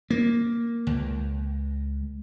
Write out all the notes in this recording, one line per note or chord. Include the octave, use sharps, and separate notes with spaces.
A#3
C#2